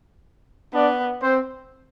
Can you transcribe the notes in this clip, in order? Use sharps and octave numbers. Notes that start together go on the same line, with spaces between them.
B3 D4 D5
C4 C5